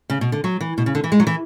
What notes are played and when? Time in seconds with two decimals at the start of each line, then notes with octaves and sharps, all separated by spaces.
0.10 C#3
0.21 B2
0.32 D3
0.44 F#3
0.61 E3
0.78 B2
0.86 C#3
0.95 D3
1.04 E3
1.12 G#3
1.20 F#3
1.27 E3